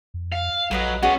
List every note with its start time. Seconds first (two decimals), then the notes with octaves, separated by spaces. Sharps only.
0.14 F2
0.32 F5
0.71 A#1 F#3 A4 B4 D#5
1.03 B3 C#4 F#4 G#4